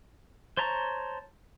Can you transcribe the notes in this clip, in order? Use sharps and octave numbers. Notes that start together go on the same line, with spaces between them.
C5 C#5 A5 A#5